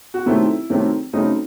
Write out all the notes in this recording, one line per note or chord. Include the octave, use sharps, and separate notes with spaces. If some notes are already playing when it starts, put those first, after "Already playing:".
F#4
C3 D#3 F#3 A3 C4 E4
C3 D#3 F#3 A3 C4
C#3 F#3 A3 C4 D#4